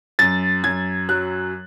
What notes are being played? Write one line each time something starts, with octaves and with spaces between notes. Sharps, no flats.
F#2 A6
F#2 G#6
F#3 F#6